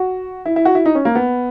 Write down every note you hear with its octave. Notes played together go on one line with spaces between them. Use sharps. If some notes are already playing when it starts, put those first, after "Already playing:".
Already playing: F#4
E4
E4
F#4
E4
D#4
C#4
A#3
B3